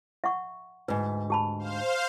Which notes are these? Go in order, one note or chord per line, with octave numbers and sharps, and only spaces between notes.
E5 F#5 C#6
D2 G#2 B4
G4 A5 B5
C5 F5